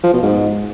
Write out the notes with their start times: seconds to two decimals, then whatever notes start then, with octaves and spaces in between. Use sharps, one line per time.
0.04 F3
0.13 B2
0.23 G#2